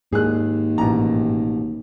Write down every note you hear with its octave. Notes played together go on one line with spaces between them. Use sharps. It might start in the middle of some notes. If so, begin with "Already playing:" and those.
D#2 G#2 G#4 F#6
A1 B2 A#5